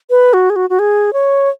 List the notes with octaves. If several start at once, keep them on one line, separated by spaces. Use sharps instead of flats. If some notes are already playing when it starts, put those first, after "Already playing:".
B4
F#4
G#4
F#4
F#4
G#4
C#5